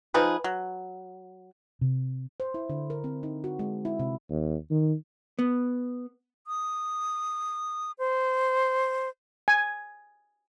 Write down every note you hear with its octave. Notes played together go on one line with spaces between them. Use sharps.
F3 D#4 G#4 B4
F#3
C3
C5
E4
D3
A#4
C4
D#4
F#4
G#3
E4
C3
D#2
D#3
B3
D#6
C5
G#5